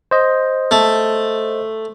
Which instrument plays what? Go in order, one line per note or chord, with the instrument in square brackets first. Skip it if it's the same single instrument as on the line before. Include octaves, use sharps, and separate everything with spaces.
[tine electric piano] C5 D#5
[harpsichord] A3